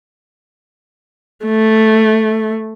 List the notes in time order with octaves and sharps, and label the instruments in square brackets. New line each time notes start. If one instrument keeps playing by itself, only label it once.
[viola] A3